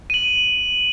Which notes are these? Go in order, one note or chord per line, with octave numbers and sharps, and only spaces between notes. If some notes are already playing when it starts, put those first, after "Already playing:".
D#7 F#7